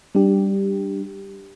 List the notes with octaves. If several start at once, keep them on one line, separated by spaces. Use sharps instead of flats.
G3 D4 G4